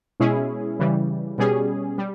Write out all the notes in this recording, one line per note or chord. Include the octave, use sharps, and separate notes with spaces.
B2 G#3 C#4 E4 G#4
C#3 E3 G3
B2 G3 C#4 G#4
G3